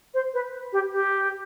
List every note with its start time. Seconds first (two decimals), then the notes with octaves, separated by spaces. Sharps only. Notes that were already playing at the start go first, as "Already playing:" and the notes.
0.14 C5
0.34 B4
0.72 G4
0.92 G4